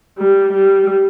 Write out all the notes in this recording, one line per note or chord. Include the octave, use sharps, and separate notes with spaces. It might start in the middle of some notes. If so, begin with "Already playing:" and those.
G3
G3